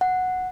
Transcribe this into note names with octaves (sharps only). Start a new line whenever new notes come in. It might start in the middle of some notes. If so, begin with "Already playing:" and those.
F#5